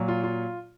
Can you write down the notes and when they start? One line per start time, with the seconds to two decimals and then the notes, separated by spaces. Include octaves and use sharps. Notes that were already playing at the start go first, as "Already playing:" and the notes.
Already playing: A#2 F#3
0.08 F4
0.24 F4